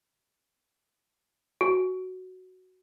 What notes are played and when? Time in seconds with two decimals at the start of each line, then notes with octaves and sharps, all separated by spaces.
1.61 F#4